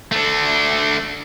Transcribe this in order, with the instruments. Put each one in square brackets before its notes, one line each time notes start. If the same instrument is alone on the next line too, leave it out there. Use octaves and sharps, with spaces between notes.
[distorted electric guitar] A3 D4